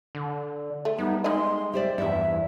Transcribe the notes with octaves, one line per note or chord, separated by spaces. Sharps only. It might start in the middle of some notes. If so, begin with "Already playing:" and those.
D3
A3
G3 B3 D#4
G#3 D#4 D#5 C6
G4 C5 D5 E5
E2 G2 E4 E5